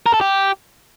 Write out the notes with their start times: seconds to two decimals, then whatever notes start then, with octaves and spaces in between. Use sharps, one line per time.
0.06 A#4
0.14 A4
0.21 G4